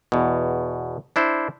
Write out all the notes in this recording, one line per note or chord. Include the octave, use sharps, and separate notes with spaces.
E2 B2
D4 E4 C5